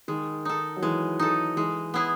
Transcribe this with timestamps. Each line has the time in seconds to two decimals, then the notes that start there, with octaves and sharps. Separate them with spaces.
0.08 D#3 G#3
0.45 D#4 A4
0.77 F#3
0.82 E3 G#3
1.19 D#4 A4
1.57 E3 G#3
1.94 B3 E4 G#4